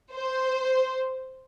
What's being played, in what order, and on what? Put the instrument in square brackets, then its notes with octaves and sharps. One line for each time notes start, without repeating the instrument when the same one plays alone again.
[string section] C5